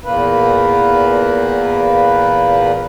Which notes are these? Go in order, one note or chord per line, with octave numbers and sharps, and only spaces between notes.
E2 A#2 A#3 B4